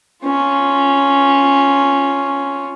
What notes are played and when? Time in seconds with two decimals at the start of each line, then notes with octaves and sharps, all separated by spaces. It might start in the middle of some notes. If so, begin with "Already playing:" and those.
0.25 C#4 F4